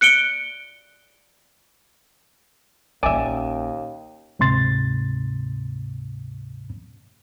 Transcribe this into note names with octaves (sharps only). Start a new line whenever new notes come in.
F#6 C#7 D7 G7
A#1 D#2 C#4 D5 E5 G#5
D2 G#2 C3 C6 A6